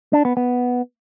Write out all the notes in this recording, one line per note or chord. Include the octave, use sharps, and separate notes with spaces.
D4
B3
B3